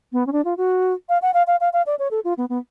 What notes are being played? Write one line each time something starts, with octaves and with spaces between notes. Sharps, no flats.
B3
C#4
D4
F4
F#4
F5
F#5
F5
F5
F5
F5
D5
C#5
A4
F4
B3
B3